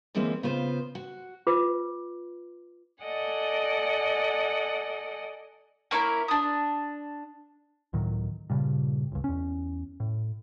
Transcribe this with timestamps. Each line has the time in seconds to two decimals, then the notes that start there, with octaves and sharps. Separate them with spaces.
0.15 D3 E3 G#3 A#3 C4 C#4
0.43 C#3 B3 F4 B4 C5
0.95 F#4
1.47 F4 B4 D6
3.04 A4 D5 D#5 F#5 G#5
5.91 A#3 C#4 E4 A#4
6.28 D4 D#6
7.93 C#2 A2 D#3 F#3
8.50 G2 A#2 C#3
9.12 G1 C#2
9.24 E2 C#4
10.00 A2